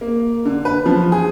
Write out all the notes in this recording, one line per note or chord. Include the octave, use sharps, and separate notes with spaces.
A#3
D3
B4
F3
G#4